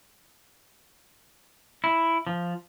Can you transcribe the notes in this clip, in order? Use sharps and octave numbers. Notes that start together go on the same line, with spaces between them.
E4
F3